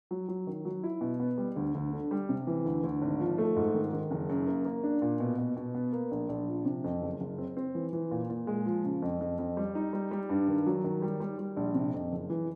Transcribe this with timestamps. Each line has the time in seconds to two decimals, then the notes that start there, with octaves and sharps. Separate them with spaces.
0.11 F#3
0.28 F#3
0.47 D#3
0.65 F#3
0.83 E4
1.01 B2
1.20 B3
1.38 G3
1.56 D2
1.75 D2
1.93 D3
2.11 G3
2.29 C3
2.47 E3
2.65 D2
2.84 D2
3.02 G#1
3.20 F3
3.38 A3
3.56 G#2
3.74 D#3
3.93 D#3
4.11 F#1
4.29 F#2
4.47 A#3
4.65 A#3
4.84 D4
5.02 A#2
5.20 B2
5.38 B2
5.57 B2
5.75 B3
5.93 A#3
6.11 A#1
6.29 A#1
6.48 F3
6.65 C3
6.84 F2
7.02 F#1
7.20 F#1
7.38 C4
7.57 C4
7.75 E3
7.93 E3
8.11 A#2
8.30 A#2
8.47 G#3
8.66 F3
8.84 C#3
9.02 F2
9.21 F2
9.39 F2
9.57 G3
9.75 D#4
9.93 G3
10.11 G3
10.29 G2
10.48 D#3
10.66 F#3
10.84 D#3
11.02 G3
11.20 G3
11.39 G3
11.57 A#1
11.75 C3
11.94 F2
12.12 F#1
12.30 E3